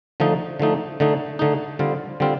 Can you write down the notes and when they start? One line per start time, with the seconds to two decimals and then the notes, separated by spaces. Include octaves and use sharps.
0.20 D3 F3 A3 D#4
0.60 D3 F3 A3 D#4
1.00 D3 A3 D#4
1.39 D3 A3 D#4
1.79 D3 G3 C4 F4
2.20 D3 G3 C4 F4